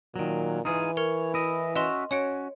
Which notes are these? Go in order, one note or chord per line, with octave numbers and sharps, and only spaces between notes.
A#2 D#3 F#3
E3 D#4 F4 G#4
A#4 C#5
E4 D#5
C#4 F#4 D#5 E5 C6
C#4 F#4 C#5 C#7 D7